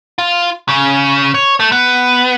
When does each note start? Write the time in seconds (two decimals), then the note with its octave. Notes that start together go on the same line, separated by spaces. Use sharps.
0.18 F4
0.68 C#3
1.34 C#5
1.60 A3
1.72 B3